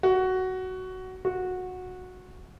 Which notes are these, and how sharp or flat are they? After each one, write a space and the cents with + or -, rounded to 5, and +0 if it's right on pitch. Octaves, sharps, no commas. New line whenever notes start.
F#4 +10
F#4 -15